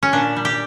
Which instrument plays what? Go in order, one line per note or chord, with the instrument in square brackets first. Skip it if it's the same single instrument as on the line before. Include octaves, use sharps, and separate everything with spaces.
[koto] C#4
A#2 D4
G3
G4